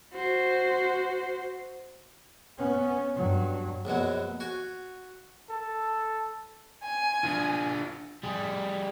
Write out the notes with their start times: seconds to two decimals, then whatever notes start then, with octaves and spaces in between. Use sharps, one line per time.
0.14 F#4 C5
2.58 B3 C#4
3.16 G2 F#3
3.85 A#1 F#2 B2 F#3
4.40 F#4 G#5
5.50 A4
6.85 G#5
7.24 D4 F4
8.23 G3 G#4